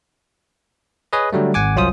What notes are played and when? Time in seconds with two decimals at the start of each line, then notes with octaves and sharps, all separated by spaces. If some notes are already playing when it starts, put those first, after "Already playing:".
1.13 G#4 B4 C#5 D#5
1.33 D3 F#3 G3 A3
1.54 G#1 F#5 G#5 D6
1.76 C2 F#2 C#4 F4 C5 D#6